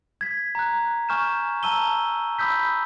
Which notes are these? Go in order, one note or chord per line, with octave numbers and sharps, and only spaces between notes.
G#6 B6
A#5 F#6
G#5 C#6 F6 G6 E7
A5 A#5 E6 D#7 G7
B5 D#6 E6 G6 B6